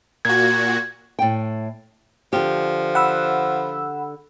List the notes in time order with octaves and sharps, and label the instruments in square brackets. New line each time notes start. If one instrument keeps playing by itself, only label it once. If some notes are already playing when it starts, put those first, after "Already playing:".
[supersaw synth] A#2 F#4 [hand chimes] G#6
[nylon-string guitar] A2 G5
[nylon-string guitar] D3 G4 [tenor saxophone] F3
[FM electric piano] F#5 B5 E6